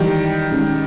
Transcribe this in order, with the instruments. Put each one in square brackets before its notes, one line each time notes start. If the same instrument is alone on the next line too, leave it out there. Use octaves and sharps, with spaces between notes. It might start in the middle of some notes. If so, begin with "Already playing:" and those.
Already playing: [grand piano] D#3 G3 [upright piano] E3 G#3 D#4
[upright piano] D#3 G#3 C#4